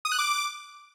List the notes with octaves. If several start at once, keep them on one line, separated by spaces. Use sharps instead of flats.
D#6
F#6
D6